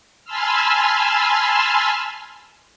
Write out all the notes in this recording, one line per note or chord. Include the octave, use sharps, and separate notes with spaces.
G#5 A5 B5 C6 E6 F6